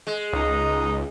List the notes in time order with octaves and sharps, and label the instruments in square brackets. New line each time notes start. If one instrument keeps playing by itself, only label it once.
[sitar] G#3
[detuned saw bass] C#2 [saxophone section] D#4